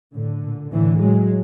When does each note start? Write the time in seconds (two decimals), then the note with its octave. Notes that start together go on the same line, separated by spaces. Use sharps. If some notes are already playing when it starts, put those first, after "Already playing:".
0.14 A2 D3
0.42 A#2
0.72 A2 D3 E3
1.00 A2 F#3 G#3